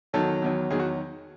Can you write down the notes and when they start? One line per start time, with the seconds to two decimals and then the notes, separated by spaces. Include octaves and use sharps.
0.13 E2 D#3 F#3 A4
0.42 E2 D#3 F#3
0.71 E2 D#3 F#3 G#4
0.80 F#4